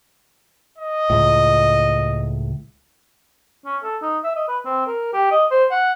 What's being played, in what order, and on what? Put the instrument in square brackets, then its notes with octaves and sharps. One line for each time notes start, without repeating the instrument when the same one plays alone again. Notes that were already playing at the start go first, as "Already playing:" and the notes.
[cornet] D#5
[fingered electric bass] C#2 A2
[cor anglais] C#4
A4
D#4
E5
D#5
B4
C4
A#4
G4
D#5
C5
F#5